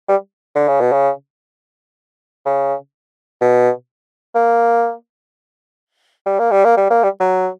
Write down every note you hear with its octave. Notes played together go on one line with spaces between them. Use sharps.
G3
D3
C#3
B2
C#3
C#3
B2
A#3
G3
A#3
G3
A#3
G3
A#3
G3
F#3